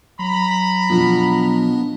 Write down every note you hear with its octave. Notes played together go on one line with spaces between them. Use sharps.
F#3 A#5 B5
B2 F3 B3 D4